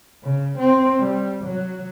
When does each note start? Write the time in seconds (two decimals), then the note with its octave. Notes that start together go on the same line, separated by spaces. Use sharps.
0.23 C#3
0.59 C4
1.00 G3
1.44 F#3